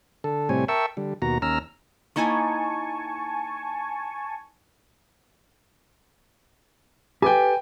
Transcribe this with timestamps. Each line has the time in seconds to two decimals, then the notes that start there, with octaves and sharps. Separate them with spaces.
0.24 D3 A4
0.49 A2 C3 G3 C4 C#5 G#5
0.68 A#4 E5 G5 A5 C#6 E6
0.97 D3 G3
1.22 D#2 B2 F#4 A#5
1.42 D#2 C#4 A#5 E6 F6
2.16 A#3 D#4 E4 G#5 A5 C#6
7.22 G4 A4 B4 G5 G#5